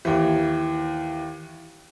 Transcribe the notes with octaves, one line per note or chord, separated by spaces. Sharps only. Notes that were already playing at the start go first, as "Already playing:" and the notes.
D#2 E3